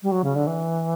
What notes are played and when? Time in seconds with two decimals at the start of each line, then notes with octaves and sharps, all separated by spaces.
0.03 G3
0.12 F#3
0.24 C#3
0.35 D3
0.47 E3